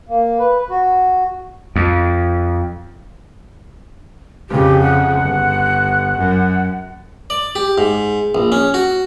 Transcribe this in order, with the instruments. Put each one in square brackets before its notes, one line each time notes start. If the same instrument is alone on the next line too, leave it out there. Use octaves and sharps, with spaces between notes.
[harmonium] A#3
B4
F#4
[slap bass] F2
[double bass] F2 C#3 [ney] G4
[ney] F#5
[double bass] G1
F#2
[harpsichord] D5
G4
G#2
A#1
C#4
F#4